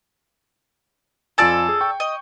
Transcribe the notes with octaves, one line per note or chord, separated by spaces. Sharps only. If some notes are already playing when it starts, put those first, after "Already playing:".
F2 F4 A4 D5 G#5 E6
G#4
G5 C#6
D#5